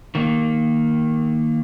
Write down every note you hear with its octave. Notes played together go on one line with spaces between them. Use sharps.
D#3 A#3